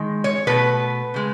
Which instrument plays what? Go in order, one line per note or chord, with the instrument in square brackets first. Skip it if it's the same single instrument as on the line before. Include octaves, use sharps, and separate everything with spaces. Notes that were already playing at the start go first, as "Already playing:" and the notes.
Already playing: [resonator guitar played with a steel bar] D#3 G#3
C#5
B2 A3 B4
C#3 G#3